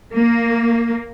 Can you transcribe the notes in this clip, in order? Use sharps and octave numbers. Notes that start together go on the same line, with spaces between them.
A#3